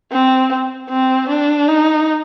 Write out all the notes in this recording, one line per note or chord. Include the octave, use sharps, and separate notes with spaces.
C4
C4
D4
D#4